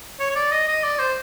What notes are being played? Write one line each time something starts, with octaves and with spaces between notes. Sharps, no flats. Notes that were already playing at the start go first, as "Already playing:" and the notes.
C#5
C#5
D5
D#5
D#5
D5
C5